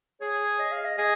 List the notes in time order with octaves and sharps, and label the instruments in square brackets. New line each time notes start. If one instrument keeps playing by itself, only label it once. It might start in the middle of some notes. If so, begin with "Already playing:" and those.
[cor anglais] G#4 [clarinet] C#5
[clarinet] D#5
F5
D#5
[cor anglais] G#4 [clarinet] D#5